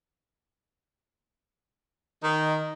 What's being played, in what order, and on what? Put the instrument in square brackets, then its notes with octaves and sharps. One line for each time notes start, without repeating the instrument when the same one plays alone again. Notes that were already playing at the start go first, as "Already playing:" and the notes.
[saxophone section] D#3